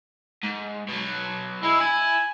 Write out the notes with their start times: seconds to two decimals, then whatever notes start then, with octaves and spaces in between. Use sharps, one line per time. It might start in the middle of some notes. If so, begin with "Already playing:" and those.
0.43 G#2
0.89 B2 F#3
1.63 G#3 E4
1.80 E4 G#5